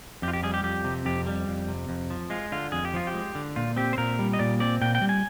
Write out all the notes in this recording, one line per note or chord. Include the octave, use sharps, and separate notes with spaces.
F2 G4
F4
G4
G3 G#4
G4
F2 G4
C3
F2 G4
G3
F2
C3
F2
F3
G#3 F4
D3 F4
F2 G#4
G4
F3 F4
G4
G#3
D3
A#2 F4
C4 G4
C5
A#2 A#4
G3
D#5
A#2 D5
C4 D5
A#2 G5
G5
G3
G#5